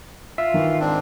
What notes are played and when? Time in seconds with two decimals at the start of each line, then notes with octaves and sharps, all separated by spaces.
0.38 F4 E5
0.54 D#3 E3
0.80 G#2 C4 D4